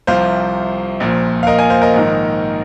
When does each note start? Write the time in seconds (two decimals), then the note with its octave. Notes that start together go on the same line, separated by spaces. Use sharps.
0.07 C2 C3 F3 C5 F5
1.00 A#1 A#2 F3
1.43 F5
1.47 A#4 D#5
1.59 D#5 G#5
1.70 C5 F5
1.82 A#4 D#5
1.94 A#1 G#2 D#3